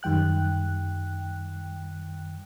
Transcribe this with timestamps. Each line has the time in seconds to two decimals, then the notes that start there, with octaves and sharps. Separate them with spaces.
0.03 F#2 D#3 G3 G5 F#6